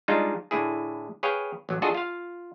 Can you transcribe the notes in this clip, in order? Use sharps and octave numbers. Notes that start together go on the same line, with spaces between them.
G3 G#3 D4 D#4 F4
A2 D3 E4 G#4
G#4 B4 C#5 F5 G5
A1 F#3
D4 F4 F#4 G#4 A4 D#5
F4 F5